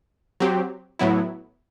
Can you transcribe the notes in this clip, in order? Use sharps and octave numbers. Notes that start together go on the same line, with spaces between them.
F#3 C4 G4
A2 F#3 B3 E4